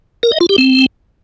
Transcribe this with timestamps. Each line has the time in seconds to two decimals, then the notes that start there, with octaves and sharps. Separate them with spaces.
0.23 A#4
0.32 D#5
0.40 F4
0.49 G4
0.58 C4